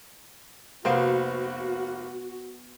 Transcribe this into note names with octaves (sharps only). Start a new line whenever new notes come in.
F1 A#3 B3 F#4 C5